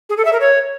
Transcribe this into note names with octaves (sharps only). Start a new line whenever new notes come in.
G#4
A4
E5
A#4
C#5